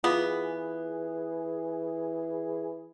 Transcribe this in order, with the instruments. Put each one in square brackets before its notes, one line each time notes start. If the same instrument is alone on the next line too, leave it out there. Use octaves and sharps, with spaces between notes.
[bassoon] E3 [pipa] B3 [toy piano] F4 F5 D6 [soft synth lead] G#4